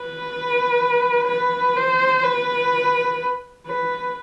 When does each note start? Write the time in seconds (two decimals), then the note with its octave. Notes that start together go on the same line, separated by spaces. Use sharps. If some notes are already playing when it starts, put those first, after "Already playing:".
Already playing: B4
1.28 B4
1.76 C5
2.23 B4
3.67 B4